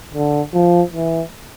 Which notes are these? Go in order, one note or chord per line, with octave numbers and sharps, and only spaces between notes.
D3
F3
E3